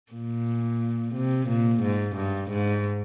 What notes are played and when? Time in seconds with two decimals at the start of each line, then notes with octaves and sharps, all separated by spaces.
0.13 A#2
1.15 C3
1.49 A#2
1.83 G#2
2.16 G2
2.51 G#2